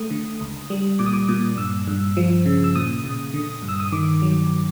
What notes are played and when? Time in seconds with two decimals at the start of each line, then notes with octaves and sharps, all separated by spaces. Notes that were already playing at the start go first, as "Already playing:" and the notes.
Already playing: A3 D#6
0.10 D3
0.41 C#2
0.70 G3
0.99 A#2 D6
1.06 D#6
1.13 D6
1.28 A#2 D#6
1.57 G2 E6
1.88 G2
2.17 F3
2.46 C#3
2.64 E6
2.75 A#2 D#6
3.04 A#2
3.34 D3
3.62 G2
3.69 E6
3.80 D#6
3.92 D#3 D6
4.22 F#3